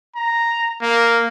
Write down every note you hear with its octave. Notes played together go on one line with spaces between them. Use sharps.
A#5
A#3